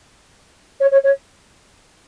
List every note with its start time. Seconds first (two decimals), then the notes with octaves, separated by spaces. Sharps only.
0.80 C#5
0.91 C#5
1.04 C#5